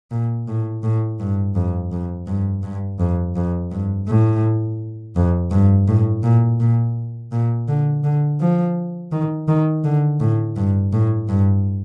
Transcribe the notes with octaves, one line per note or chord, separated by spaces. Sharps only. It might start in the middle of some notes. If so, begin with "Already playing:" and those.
A#2
A2
A2
G2
F2
F2
G2
G2
F2
F2
G2
A2
F2
G2
A2
A#2
A#2
A#2
D3
D3
F3
D#3
D#3
D3
A2
G2
A2
G2